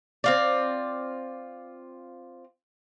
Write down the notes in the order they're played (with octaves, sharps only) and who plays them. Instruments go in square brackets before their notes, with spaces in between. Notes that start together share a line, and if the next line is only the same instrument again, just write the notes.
[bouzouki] C4 F4 D5